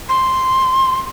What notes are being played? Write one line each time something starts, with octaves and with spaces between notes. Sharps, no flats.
C6